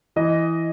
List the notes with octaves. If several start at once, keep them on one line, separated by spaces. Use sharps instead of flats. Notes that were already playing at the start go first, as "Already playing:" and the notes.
E3 D#5